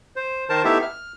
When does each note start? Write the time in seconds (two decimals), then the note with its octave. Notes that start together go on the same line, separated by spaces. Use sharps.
0.16 C5
0.49 D#3 A#4 C5 A5
0.64 A3 B3 D#4 E4 G4 E5
0.82 F6